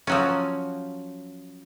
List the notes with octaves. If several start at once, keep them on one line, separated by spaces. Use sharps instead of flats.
F3 F#3 C#4